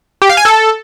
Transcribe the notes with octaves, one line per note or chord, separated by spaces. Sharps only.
G4
F5
G#5
A4